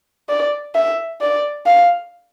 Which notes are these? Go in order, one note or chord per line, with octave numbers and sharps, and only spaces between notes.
D5
E5
D5
F5